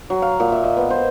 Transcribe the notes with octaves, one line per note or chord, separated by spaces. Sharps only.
F#3
F5
A#2
E5
D#5
B3
C5